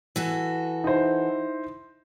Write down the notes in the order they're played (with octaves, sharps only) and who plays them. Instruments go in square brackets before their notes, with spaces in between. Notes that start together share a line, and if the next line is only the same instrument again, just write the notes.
[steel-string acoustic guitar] E3 F#4 A4
[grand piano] D#4 E4 C5